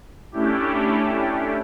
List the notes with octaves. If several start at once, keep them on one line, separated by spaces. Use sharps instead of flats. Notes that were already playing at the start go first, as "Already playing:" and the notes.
A3 C#4 D4 E4 G4